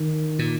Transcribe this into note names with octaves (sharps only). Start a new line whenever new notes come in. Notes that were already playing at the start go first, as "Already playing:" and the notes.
Already playing: D#3
A#2